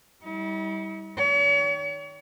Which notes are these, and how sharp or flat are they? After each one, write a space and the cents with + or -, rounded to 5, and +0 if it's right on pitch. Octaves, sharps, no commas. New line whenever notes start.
G3 +0 E4 -45
D#3 +0 C#5 +40